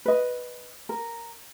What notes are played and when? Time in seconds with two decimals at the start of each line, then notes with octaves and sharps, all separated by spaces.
0.05 B4 D#5
0.89 A#4